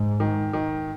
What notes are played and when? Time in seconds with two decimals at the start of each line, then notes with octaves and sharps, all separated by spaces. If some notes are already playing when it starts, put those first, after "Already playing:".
Already playing: G#2
0.20 D#3
0.53 D#3